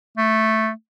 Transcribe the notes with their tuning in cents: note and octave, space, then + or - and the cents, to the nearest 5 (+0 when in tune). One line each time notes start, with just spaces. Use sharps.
A3 +0